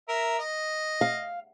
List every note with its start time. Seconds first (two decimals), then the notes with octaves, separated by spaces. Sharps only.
0.09 A#4 E5
0.39 D#5
1.01 F5